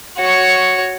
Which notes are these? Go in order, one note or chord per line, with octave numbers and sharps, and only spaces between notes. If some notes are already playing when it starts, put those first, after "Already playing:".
F#4 C#5